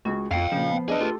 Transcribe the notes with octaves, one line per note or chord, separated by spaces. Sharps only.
C#2 F#4 G#4
F2 F4 F5 G5 C7
A#2 C#3 F3
B3
D4 G#4 B4 D#5 A5
A3 F4 G4 A4